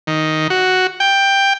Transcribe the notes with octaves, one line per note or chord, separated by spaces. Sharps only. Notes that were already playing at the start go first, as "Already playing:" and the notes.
D#3
F#4
G5